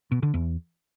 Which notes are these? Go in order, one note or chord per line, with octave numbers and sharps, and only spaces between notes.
B2
D3
E2